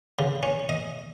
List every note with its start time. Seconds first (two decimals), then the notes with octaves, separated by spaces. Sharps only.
0.19 C#3
0.43 C#4
0.69 D#5